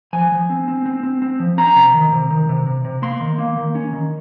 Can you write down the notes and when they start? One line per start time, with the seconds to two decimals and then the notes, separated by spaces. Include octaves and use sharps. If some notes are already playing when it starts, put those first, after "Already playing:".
0.13 F3 G#5
0.32 F3
0.50 C4
0.68 C4
0.86 C4
1.03 C4
1.22 C4
1.40 F3
1.58 C#4 A#5
1.76 C3
1.94 D#3
2.12 C3
2.30 D#3
2.49 C3
2.67 C3
2.85 C3
3.02 A#3 C6
3.21 D#3
3.38 A#3
3.57 D#3
3.75 C#4
3.93 D#3